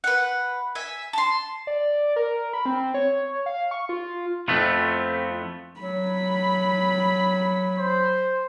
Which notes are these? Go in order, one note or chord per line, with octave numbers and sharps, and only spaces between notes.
B4 F#5
E5 G#5
A5 C6
D5
A#4
B5
C4
C#5
F5
C#6
F4
F2 A3 B3 C4 E4 F4
F#3 B5
C5